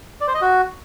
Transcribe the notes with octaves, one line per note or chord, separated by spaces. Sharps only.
D5
C5
D#5
F#4